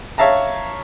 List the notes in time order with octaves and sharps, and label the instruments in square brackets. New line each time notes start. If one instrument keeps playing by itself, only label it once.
[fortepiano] C#5 E5 F5 A5 A#5